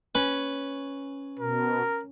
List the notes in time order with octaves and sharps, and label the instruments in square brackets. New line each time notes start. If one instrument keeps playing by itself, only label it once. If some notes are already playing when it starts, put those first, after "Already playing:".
[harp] C#4 [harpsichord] B4
[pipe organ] B2 [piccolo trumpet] A#4